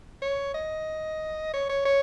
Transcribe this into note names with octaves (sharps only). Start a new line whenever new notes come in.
C#5
D#5
C#5
C#5
C#5